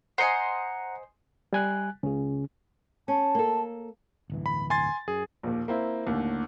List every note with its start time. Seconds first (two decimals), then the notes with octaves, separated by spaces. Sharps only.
0.18 C5 D#5 F#5 G#5 A#5 C#7
1.53 G3 G#5 F#6
2.03 C#2 C#3 C#4
3.08 C#4 A5
3.35 A#3 A4
4.30 D1 G1 E3
4.46 B5
4.70 G#5 C6 A6
5.08 F#2 G#4
5.43 A#1 D#2
5.68 A#3 C4 E4
6.07 D#2 A2 D3